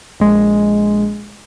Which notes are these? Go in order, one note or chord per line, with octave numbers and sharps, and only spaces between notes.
A#1 G#3